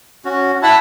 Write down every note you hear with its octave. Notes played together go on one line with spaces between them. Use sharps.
C#4 F#4
E4 F#5 A5 B5